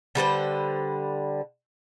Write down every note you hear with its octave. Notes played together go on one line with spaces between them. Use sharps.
D3 G3 B4 C5